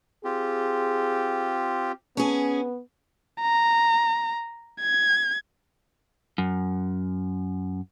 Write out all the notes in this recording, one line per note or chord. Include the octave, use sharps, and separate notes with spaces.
C4 F4 G4 G#4
B3 C#4 G#4
A#5
G#6
F#2